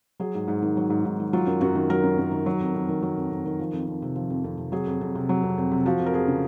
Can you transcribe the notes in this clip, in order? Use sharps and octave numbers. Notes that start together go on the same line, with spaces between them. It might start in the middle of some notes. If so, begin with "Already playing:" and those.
F#3 G#4
G#2
G#2
D#3
F#3
G#2
G#2
D#3
F#3 F4
F#2
F#2 F#4
D#3
F#3 A#4
F#2
F#2
D#3
F#3
F2
F2
D#3
F#3
F2
F2
D#3
F3
F2
F2
C3
F3
F2
F2
C3
F#3 G#4
F2
F2
C3
F#3
F2
F2
C3
F3 F#4
F2
A#4
F2 G#4
C#3